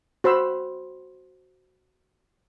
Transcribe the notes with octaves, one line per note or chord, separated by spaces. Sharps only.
F#4 C5 B5 E6